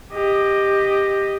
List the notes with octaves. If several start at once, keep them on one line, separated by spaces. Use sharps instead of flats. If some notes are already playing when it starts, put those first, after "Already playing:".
G4 D#5